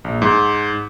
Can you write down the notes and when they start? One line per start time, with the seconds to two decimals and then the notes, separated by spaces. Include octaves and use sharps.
0.04 A#1
0.22 G#2